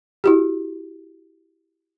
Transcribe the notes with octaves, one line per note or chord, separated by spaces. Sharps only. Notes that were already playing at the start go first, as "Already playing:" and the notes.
E4 F#4 G4